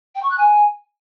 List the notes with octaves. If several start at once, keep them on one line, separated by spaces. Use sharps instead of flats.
G5
C#6
F#6
G#5